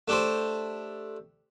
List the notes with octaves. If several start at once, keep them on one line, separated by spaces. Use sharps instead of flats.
A3 D4 G4 A4 C5